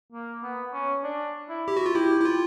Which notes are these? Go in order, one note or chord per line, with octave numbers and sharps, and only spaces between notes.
A#3
B3
C#4
D4
E4
G4
F#4
F4
E4 G4
E4
F4